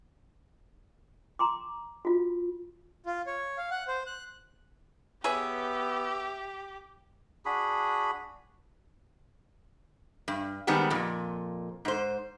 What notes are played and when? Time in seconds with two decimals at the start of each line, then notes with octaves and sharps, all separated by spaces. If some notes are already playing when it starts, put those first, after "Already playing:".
1.39 A#5 C6 D6
2.05 F4 F#4
3.06 F4
3.27 C#5
3.58 F5
3.71 F#5
3.88 C5
4.06 F#6
5.24 B3 G4 G#4 B4 C#5 E5
7.45 D4 F#4 G#4 B5
10.28 G2
10.67 D#3 G3 G#3 B3 C4
10.90 F2 A#2
11.85 G#2 C5